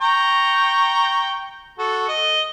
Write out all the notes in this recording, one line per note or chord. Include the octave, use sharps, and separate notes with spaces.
G5 A#5 C#6
F#4 A4
D#5